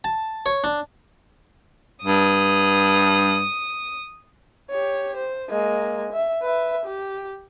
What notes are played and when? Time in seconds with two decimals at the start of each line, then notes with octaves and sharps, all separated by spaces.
0.04 A5
0.46 C#5
0.64 D4
2.04 G2 D#6
4.71 G4 C#5
5.17 C5
5.50 G#3 A#3
6.13 E5
6.42 B4 E5
6.86 G4